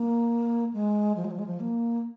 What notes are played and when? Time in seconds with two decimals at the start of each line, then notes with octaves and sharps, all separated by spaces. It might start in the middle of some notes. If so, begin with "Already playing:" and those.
Already playing: A#3
0.74 G#3
1.16 F3
1.25 G#3
1.31 F3
1.39 G#3
1.47 F3
1.60 A#3